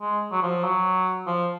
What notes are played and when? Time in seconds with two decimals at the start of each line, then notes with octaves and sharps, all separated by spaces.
0.01 G#3
0.32 F#3
0.43 F3
0.64 F#3
1.27 F3